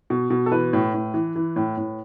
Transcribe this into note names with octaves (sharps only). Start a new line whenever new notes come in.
B2
B2
A4
E3 B4
A2
A2
E3
E3
A2
A2